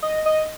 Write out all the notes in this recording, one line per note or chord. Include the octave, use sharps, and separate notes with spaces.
D#5
D#5